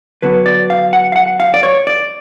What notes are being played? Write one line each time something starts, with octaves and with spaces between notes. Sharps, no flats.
D3 F#3 B3 B4
D5
F5
F#5
F5
F#5
F5
D5
C#5
D5